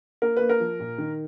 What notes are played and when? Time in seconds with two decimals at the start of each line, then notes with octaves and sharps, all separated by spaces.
0.22 A#3 A#4
0.37 A#3 B4
0.49 A#4
0.60 F3
0.80 A#2
0.98 D#3